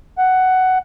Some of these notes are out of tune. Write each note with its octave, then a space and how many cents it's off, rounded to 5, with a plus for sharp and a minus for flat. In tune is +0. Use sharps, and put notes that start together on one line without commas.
F#5 +10